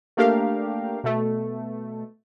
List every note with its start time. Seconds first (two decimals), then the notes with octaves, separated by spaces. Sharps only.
0.17 A3 A#3 D4 G4 A#4 F5
1.04 B2 A3